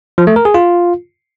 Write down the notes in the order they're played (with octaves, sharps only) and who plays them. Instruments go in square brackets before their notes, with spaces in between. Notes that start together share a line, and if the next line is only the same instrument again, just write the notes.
[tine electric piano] F3
A3
A#4
G#4
F4